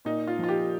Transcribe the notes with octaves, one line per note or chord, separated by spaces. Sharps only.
A#2 D#4
F4
F3 F4
G4